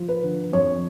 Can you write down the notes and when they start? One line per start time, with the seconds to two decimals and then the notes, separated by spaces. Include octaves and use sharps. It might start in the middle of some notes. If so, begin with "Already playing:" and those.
Already playing: F3
0.08 B4
0.23 D3
0.52 F2 C#5